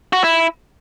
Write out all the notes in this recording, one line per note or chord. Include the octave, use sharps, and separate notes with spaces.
F#4
E4